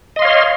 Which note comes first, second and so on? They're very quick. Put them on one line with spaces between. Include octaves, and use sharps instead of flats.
D#5 C6 F5 C#5